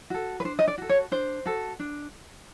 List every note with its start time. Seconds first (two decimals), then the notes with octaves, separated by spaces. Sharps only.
0.10 F#4 A4
0.40 B4
0.45 D4 C5
0.59 D#5
0.68 D5
0.78 F#4 A4
0.89 C#5
1.12 D4 C5
1.46 F#4 A4
1.80 D4